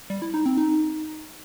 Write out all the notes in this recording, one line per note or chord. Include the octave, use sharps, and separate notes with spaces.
G3
E4
D#4
C4
D#4